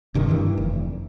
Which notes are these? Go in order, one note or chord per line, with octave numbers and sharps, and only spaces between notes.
F1 G2 C3 D#3
G2 D#3 E3
F1